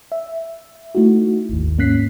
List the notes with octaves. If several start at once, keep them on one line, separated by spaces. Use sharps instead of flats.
E5
A3 D#4 E4 F#4
G#1 D#2
G#2 A#3 C#4 F#6 B6 C7